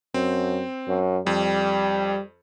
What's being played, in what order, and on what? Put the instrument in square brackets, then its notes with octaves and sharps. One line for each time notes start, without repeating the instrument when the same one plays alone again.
[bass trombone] F#2 [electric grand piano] C4
[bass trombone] F#2
[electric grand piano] F2 [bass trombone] G3